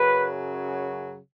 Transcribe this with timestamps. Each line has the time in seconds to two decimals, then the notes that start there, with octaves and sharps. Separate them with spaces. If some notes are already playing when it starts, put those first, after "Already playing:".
Already playing: F#2 C#3 F#3 B4